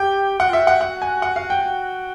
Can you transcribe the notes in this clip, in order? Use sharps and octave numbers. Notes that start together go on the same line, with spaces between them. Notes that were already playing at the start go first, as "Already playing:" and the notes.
Already playing: G4 G5
F#4 F#5
F4 E5
F#4
F#5
F#5
G#5
F#5
F5
G5
F#4